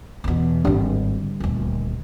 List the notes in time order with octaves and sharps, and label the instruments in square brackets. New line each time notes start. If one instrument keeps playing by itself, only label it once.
[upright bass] E2 B2
[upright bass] G#1 D3 [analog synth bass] G2
[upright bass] D#1 D2